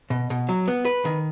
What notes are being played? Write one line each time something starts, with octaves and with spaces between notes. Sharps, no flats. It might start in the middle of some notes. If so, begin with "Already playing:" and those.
B2
B2
F#3
B3
B4
D#3